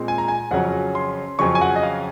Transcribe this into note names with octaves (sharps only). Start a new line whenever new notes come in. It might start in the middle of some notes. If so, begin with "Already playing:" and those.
Already playing: A#2 G#3 C4
G#5
A#5
G#5
F2 C#3 F#3 C#4 F#5
C6
F2 C#3 F#3 C#4 C#6
G#5
F#5
D#5
F5